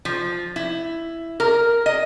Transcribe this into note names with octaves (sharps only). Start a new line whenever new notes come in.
F3
E4
A#4
D#5